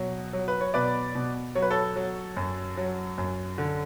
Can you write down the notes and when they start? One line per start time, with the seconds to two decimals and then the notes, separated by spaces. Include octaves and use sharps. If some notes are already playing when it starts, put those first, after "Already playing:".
Already playing: B2 F#3
0.33 F#3
0.48 B4
0.61 C#5
0.74 B2 B4 D5
1.15 B2
1.55 F#3 C#5
1.62 B4
1.70 A4 C#5
1.96 F#3
2.37 F#2
2.77 F#3
3.18 F#2
3.58 D3